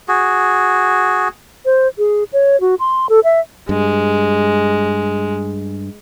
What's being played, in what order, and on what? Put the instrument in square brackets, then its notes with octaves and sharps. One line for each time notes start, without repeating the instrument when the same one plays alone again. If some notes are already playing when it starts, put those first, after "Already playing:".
[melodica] F#4 G#4
[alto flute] C5
G#4
C#5
F#4
C6
A4
E5
[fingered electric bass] G2 [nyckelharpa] G#3